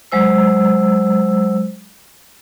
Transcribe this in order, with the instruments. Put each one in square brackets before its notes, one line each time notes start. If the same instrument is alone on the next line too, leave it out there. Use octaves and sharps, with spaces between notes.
[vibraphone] F#3 G#3 C5 E6